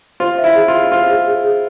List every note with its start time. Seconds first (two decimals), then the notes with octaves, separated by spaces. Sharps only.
0.20 F4 C5
0.38 E5
0.44 E4
0.55 G#4
0.68 F4
0.74 E5
0.91 F4 C5
1.09 G#4
1.27 G#4
1.44 G#4